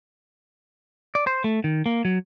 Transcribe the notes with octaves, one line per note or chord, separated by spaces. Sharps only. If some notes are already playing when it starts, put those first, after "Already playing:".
D5
C5
A3
D#3
A#3
F#3